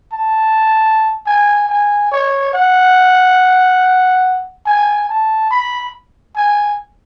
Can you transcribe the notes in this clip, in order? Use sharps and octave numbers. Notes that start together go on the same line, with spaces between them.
A5
G#5
G#5
C#5
F#5
G#5
A5
B5
G#5